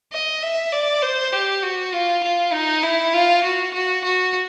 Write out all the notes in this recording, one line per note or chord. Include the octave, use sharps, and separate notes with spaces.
D#5
E5
D5
C5
G4
F#4
F4
F4
D#4
E4
F4
F#4
F#4
F#4